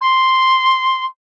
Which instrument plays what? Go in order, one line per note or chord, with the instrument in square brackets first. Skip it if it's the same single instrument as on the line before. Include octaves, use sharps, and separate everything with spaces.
[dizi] C6